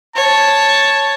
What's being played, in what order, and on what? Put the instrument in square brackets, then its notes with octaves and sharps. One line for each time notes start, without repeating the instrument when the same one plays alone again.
[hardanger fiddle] C#5 [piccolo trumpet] A5